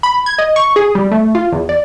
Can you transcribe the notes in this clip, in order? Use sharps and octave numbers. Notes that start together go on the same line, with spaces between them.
B5
G#6
D#5
C#6
G#4
G3
A3
F4
E2
D5